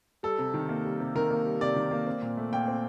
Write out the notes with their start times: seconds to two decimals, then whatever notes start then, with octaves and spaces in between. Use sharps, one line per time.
0.23 G3 A4
0.39 C3
0.54 D#3
0.69 A#3
0.85 G3
1.00 C3
1.15 D#3 A#4
1.31 A#3
1.46 G3
1.61 C3 D5
1.76 D#3
1.91 A#3
2.07 C4
2.22 A#2
2.37 A3
2.52 A#2 G5
2.68 C4